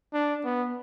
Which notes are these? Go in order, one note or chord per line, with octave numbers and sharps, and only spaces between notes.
D4
B3